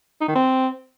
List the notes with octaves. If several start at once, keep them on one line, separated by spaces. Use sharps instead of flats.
D#4
D#3
C4